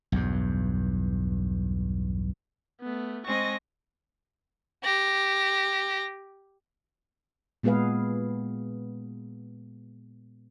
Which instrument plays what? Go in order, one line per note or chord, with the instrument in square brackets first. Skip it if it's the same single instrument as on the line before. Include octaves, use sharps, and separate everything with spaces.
[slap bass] B1 E2 G2
[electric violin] A3 B3
[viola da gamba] G#3 C4 D#5 [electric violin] C#6 A#6
[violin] G4 A#6
[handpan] A#2 G#3 B3 G#4 B4 F5